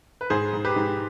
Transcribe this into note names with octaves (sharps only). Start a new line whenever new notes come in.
B4
G#2 G#4 C5
G#2
G4 B4
G#2